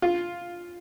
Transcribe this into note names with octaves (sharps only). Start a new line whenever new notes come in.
F4